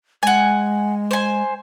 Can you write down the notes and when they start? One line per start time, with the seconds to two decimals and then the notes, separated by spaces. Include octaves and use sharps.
0.23 G#3 F#5 G#5
1.11 C5 G#5